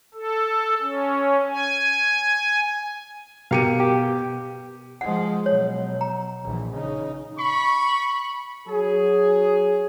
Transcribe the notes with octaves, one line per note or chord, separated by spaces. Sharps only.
A4
C#4
G#5
B2 G4 A#4 F5 C#7 D#7
G4
F3 G#3 F#5
B2 F#3 C#5
A#5
A#1 E3
C#3 D#4
B5 C#6
F#3 G#4